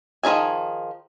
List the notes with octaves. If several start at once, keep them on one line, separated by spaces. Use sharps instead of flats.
D#3 F3 D4 G#4 G#5